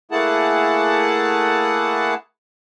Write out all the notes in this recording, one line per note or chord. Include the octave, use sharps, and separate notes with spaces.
A3 A#3 E4 G#4 F#5 A5